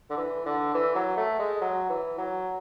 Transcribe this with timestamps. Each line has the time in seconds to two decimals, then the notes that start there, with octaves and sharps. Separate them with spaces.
0.10 D3
0.18 E3
0.46 D3
0.75 E3
0.96 F#3
1.17 A3
1.40 G#3
1.61 F#3
1.90 E3
2.18 F#3